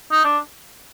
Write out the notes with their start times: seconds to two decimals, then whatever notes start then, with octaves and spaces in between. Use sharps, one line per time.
0.12 D#4
0.25 D4